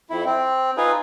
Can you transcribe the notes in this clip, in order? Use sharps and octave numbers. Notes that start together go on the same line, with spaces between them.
F2 E4
C4
D#4 F4 G#4 B4